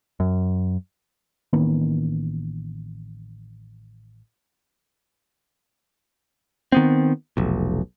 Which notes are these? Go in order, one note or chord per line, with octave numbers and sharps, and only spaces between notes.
F#2
A1 D#3 A#3 B3
D#3 B3 C4
F1 B1